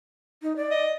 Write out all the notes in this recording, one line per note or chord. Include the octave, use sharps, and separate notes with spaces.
D#4
D5
D#5